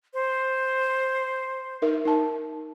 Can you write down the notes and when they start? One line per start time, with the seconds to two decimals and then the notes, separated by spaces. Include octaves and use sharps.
0.14 C5
1.82 D#4 A#4 E5
2.05 D#4 A5